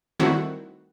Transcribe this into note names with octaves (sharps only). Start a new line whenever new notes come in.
D#3 G3 A3 C4 E4 F#4